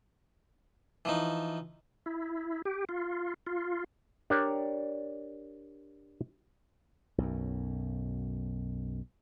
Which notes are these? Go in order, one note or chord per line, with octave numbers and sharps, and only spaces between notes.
E3 F3 D#4
E4
G4
F4
F4
D4 G4 A#4 C#5 D5
B1 F#2